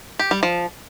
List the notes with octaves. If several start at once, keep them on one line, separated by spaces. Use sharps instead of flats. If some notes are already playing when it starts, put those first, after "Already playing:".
G4
G3
F3